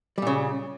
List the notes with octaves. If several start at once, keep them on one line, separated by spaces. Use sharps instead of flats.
A#2 C#3 G3